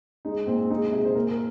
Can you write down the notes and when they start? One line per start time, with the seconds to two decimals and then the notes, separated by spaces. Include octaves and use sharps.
0.25 G#3 D#4
0.47 A#2 C4
0.70 G#3 D#4
0.92 C3 G#4
1.05 C5
1.15 A#2 A#4
1.31 A#4